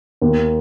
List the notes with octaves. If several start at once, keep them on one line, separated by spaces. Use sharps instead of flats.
D#2